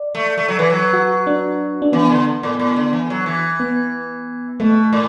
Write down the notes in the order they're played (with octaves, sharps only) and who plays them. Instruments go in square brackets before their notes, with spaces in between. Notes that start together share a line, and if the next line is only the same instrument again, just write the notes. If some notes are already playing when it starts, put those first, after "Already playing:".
Already playing: [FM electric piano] D5
[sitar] A3
A3
F#3
[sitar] E3 [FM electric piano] B4
[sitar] F#3
[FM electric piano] F#4
D4
D4
[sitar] E3 [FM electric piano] B3
[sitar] D3
A2
A2
D3
E3
F#3
E3
[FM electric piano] B3
[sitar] B2 [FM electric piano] A3
[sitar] A2